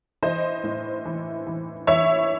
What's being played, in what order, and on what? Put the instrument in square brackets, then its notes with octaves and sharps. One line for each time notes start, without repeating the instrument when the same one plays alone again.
[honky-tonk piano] E3 C5 D#5
A2
E3
E3
E3 C#5 E5